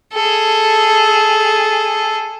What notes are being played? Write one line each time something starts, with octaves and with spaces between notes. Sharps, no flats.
G#4 A4